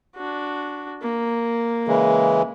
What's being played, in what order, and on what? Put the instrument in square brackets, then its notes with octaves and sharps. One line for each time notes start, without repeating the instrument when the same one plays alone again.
[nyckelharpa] D4 F#4
A#3
[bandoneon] C#3 E3 G#3